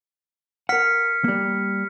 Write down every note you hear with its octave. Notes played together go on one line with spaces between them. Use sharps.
A#4 F#5 F6 B6 C#7
G3 A#3